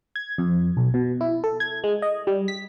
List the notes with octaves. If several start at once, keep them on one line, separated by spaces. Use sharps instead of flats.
G#6
F2
B1
B2
E4
A4
G#6
G#3
D#5
G3
B6